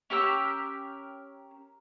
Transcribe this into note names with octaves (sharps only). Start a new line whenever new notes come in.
C#4 G4 A#4 E6